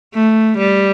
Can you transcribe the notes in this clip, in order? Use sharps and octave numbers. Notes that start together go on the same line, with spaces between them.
A3
G3